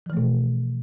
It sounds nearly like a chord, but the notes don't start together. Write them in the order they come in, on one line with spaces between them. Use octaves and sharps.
F3 E3 A3 B2